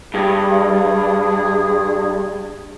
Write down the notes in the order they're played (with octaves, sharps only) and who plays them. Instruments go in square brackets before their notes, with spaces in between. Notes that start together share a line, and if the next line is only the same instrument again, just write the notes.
[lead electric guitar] G2 [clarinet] G#4